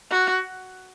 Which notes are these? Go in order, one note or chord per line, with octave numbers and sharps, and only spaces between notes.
F#4